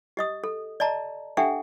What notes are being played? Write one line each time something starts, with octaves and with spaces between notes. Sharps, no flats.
G4 D#5 D#6
A4
D5 D#5 A5 A#5
D4 G4 A4 E5 F#5 G5